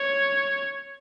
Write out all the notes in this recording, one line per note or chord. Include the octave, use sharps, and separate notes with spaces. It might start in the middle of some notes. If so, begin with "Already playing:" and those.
Already playing: C#5